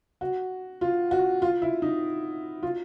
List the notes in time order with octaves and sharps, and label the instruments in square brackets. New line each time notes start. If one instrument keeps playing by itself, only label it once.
[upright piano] F#4
F4
F#4
F4
E4
D#4
F4